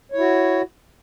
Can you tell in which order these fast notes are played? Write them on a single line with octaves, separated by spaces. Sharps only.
C#5 E4 F#4